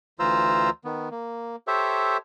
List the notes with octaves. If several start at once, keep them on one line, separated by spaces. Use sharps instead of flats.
D2 E3 F4 C5 A#5 E6
D#3 B3
A#3
G4 A4 C5 C#5 E5